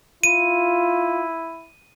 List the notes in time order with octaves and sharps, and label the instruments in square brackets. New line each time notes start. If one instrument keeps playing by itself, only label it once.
[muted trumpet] E4 [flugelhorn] F4 [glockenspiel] D#7